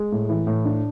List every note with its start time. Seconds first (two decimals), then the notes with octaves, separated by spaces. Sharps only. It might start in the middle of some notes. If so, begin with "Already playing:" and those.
Already playing: G#3
0.12 A2
0.29 E3
0.47 A2
0.65 D4